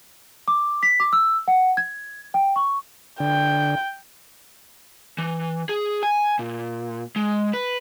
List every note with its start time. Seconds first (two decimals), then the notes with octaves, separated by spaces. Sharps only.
0.48 D6
0.83 B6
1.00 D6
1.13 E6
1.48 F#5
1.77 G#6
2.34 G5
2.56 C#6
3.20 D3 G5
5.18 E3
5.69 G#4
6.03 G#5
6.39 A#2
7.16 G#3
7.53 B4